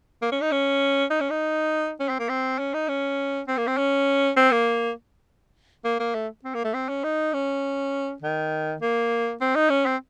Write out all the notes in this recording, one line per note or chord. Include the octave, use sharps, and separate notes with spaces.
A#3
C#4
D#4
C#4
D#4
C#4
D#4
C#4
C4
A#3
C4
C#4
D#4
C#4
C4
A#3
C4
C#4
C4
A#3
A#3
A#3
A3
C4
A#3
A3
C4
C#4
D#4
C#4
D#3
A#3
C4
D#4
C#4
C4